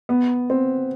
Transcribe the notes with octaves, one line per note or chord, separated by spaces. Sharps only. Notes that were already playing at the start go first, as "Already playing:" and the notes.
B3
C4